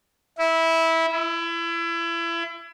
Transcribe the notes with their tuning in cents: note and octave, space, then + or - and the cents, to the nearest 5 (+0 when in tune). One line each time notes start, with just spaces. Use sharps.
E4 -15
E4 +30